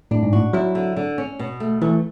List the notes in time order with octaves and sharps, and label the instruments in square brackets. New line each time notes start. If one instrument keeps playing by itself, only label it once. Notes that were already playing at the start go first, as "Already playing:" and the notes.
[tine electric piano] A2 [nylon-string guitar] D4
[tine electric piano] G#2
[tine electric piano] A2 [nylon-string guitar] F#4
[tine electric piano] F#3 [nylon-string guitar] E4
[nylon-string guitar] D3
D3
C#4
B2
A3
[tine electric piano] E3 [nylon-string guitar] A3